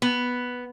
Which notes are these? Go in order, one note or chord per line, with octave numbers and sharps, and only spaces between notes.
B3